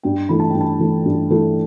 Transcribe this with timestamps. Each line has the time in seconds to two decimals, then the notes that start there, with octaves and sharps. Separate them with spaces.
0.03 G2 G5
0.29 E3 A3 B5
0.40 A5
0.50 G2 G5
0.61 A5
0.79 E3 A3
1.05 G2
1.30 E3 A3